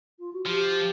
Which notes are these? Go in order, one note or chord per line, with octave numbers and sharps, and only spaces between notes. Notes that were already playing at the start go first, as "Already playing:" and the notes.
F4
F#4
F3 G4